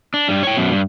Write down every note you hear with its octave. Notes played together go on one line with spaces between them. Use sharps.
D4
G2 G3
C#5 G5
F#2 B2
G2